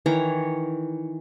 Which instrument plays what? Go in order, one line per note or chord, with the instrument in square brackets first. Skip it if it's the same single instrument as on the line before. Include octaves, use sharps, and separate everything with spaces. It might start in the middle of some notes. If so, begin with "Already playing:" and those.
[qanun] D#3 E3 C#5 A#5